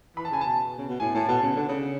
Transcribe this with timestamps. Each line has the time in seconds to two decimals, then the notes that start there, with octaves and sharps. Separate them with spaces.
0.17 E3 B5
0.25 A5
0.31 C#3 G#5
0.41 B2 A5
0.78 C#3
0.89 B2
1.00 A2 G#5
1.15 A2 A5
1.28 B2 A5
1.42 C#3
1.56 D3
1.69 C#3